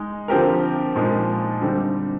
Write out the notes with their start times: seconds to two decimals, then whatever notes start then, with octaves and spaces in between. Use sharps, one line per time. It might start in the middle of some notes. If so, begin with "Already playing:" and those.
Already playing: G#3 D#4
0.28 D3 F3 C4 G4 A#4
0.95 A#2 F3 G#3 D#4
1.62 D3 G3 C4 D#4